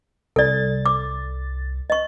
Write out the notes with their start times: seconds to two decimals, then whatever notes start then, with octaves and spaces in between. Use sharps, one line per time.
0.36 C2 A4 D5 A6
0.86 D6
1.90 D#5 C#6